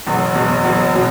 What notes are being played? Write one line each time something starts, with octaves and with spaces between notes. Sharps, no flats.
F#1 E2 B2 F#3
F#1 E2 B2 F#3
F#1 E2 B2 F#3
B2 F#3